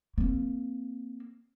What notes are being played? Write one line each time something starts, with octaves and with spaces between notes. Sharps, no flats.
A#3 C4